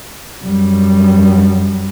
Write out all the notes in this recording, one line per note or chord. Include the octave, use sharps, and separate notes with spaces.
F#2 G3